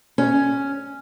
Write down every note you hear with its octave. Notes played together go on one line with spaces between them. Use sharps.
C#4